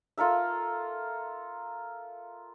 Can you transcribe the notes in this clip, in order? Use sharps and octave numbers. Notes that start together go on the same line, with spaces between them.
F4 A4 A#4 E5